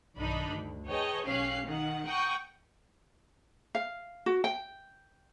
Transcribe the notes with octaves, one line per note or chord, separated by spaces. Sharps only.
B1 G2 D#3 D4 D#4 B5
D2
G#4 B4 C#5 D#5 G5 A5
B1 C#4 G4 F5 F#6 C7
D#3 F#5
F#5 G5 A#5 C#6 D#6
F5
F#4
G5